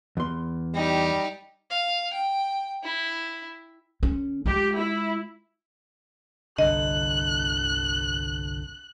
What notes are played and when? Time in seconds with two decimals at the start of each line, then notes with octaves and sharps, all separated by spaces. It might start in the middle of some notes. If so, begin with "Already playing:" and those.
0.17 E2 C6
0.74 G3 D#4 G4
1.70 F5
2.13 G5
2.83 E4
4.03 D3 C#4
4.46 G#3 F4 G4
4.76 E4
6.59 G1 C2 D3 D#5 F#6